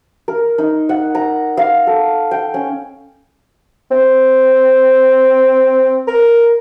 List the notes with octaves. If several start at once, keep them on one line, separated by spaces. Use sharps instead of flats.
A#4
D#4
F#5
A#5
F5
A4
G5
C#4
C4
A#4